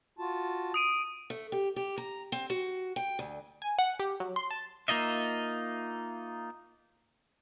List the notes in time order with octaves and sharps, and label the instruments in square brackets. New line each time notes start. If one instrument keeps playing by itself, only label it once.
[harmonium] F4 F#4 A5
[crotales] D#6 D7 D#7
[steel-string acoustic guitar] A3
G4
G4
A#5
C4
F#4
G5
D2
[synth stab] G#5
F#5
G4
F#3
C6
A5
[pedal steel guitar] A#3 D#4 F4 D#5 E5